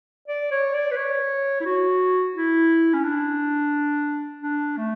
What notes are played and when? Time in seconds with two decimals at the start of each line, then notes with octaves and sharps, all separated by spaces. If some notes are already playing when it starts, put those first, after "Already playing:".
0.28 D5
0.51 C#5
0.74 D5
0.91 B4
0.97 C#5
1.61 E4
1.66 F#4
2.36 E4
2.94 C#4
3.04 D4
4.43 D4
4.77 A3